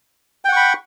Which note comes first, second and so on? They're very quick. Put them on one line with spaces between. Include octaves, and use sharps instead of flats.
G5 F#5 C#6 B5